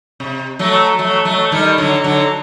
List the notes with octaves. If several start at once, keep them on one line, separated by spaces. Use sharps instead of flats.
C3
F#3 A3
F#3 A3
F#3 A3
D#3 G3
D3 F#3
D3 F#3